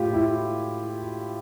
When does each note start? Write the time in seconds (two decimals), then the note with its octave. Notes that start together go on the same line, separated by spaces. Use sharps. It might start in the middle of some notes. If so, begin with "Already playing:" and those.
Already playing: A2 F4 G4
0.13 E4